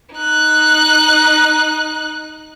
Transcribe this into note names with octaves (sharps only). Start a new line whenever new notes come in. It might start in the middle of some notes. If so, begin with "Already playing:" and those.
D#4 F#6